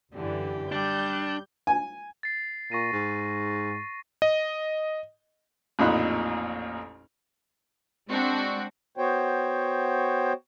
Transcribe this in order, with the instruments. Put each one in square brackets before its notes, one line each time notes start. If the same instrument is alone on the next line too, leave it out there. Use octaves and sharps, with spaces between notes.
[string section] F#2 D3 E3 [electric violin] G4
[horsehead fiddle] G3 [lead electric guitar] D4 [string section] G6
[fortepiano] G#5
[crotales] A6 C7
[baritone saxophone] A#2 [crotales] C#6 A#6 D#7
[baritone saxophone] G#2
[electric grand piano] D#5
[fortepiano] A1 F2 A#2 D#4 B5 F#6
[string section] G#3 C4 D4 F#4
[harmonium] B3 F#4 C5 C#5 G5